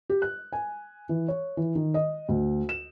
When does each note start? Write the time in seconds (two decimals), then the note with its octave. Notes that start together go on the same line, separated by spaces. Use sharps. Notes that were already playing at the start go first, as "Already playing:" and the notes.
0.10 G4
0.22 F#6
0.52 G#5
1.09 E3
1.28 C#5
1.57 E3
1.75 D#3
1.94 D#5
2.29 D2
2.69 E7